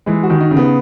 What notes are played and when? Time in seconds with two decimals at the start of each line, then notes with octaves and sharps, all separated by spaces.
0.06 E3 G#3
0.23 F#4
0.30 D#3
0.40 D#4
0.51 C#3
0.57 B3